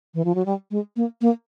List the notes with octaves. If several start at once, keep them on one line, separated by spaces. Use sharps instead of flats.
E3
F3
F#3
G3
G#3
A#3
A#3